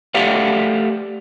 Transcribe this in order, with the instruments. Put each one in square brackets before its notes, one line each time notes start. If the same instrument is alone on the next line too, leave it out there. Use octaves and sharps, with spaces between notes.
[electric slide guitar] A3 G4 D5 F5 F#5